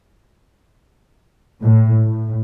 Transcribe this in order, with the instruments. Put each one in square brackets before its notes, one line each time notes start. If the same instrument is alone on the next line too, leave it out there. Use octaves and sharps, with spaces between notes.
[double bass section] A2
A2